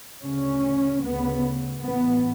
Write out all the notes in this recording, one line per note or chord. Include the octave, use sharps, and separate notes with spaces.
D2 C#3 C#4
D2 C#3 B3
A1 A2 B3